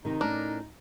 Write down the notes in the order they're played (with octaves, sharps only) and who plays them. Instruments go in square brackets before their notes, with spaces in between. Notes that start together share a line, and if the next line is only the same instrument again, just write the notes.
[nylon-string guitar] C3 D#3 [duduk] D#4
[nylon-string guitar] A2 C#4 [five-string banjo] D4 A#4